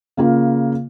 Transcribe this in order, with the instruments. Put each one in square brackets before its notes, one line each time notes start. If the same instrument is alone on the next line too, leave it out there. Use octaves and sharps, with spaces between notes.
[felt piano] C#3 A#3 F4